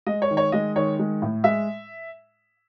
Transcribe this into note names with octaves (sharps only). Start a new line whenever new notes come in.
G#3 D#5
C#5
D#3
C#5
G#3 D#5
D#3 C#5
G#3
A2
G#3 E5